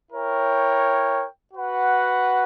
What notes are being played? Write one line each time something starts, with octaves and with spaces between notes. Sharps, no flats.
E4 A#4 C#5 G5
F#4 B4 F#5